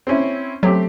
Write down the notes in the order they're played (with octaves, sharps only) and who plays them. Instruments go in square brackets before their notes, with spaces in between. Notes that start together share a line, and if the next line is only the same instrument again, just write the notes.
[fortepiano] C4 C#4 E4
[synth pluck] F#3 [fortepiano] A3 C4 G4